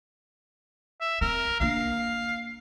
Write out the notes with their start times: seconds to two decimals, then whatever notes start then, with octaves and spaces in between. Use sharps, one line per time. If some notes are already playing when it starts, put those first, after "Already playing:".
1.01 E5
1.21 C4 A#4
1.60 A#3 D4 F5